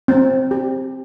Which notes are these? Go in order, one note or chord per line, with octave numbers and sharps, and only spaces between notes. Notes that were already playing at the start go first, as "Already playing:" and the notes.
C4
G4